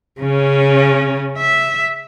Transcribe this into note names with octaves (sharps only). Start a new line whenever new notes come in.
C#3 C#4
E5